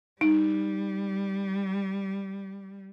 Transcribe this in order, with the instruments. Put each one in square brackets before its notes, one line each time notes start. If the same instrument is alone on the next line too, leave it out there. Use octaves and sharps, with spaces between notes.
[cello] G3 [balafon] D#4